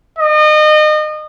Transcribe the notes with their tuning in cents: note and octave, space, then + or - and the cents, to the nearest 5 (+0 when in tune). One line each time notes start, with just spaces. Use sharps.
D#5 -30